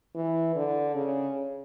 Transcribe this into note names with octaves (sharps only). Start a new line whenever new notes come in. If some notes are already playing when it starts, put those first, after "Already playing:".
E3
D3
C#3